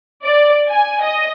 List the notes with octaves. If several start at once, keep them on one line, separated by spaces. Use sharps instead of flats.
D5
G#5
D#5